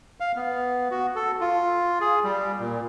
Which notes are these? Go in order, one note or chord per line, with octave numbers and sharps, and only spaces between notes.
F5
B3
F#4
A4
F4
G#4
G3
A#2